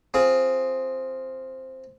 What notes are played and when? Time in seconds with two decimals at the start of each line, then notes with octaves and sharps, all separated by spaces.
0.14 C4 F4 G#4